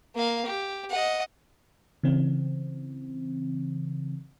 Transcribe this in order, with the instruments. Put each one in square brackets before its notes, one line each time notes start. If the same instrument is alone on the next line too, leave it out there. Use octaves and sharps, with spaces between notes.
[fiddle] A#3 F5
G4
D#5 F#5
[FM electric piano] C#3 E3 C4